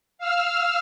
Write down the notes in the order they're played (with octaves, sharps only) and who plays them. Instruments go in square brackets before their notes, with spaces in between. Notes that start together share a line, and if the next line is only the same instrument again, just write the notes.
[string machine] F5 E6 F6